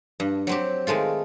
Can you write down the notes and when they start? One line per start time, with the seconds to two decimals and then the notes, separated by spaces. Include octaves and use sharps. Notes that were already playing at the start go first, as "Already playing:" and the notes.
0.20 G2
0.47 F#3 C4 G4
0.87 D#3 G#3 A3 F4